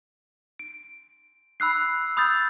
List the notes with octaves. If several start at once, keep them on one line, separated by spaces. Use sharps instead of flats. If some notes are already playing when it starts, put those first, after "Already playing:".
D7
B5 E6 F#6 C7
B5 D#6 E6 G6 A6